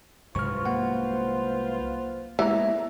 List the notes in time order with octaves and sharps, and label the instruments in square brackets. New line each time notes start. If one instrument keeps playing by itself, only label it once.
[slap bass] C2 G#2 F#3 [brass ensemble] F4 B4 C5 [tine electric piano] C#6 F6
[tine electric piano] A#3 F#5
[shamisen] E3 [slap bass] G#3 A#3 B3 [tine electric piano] E5 A#5